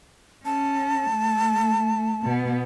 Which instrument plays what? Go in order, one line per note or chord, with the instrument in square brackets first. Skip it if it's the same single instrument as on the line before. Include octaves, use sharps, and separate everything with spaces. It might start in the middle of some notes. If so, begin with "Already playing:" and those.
[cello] C#4 [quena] A5
[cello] A3
B2 B3